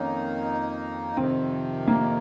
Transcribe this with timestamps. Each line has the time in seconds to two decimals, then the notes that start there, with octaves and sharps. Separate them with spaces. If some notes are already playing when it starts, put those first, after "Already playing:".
Already playing: F2 D#3 A#3 C#4 D#4
1.17 F2 C3 D#3 C4
1.87 A#3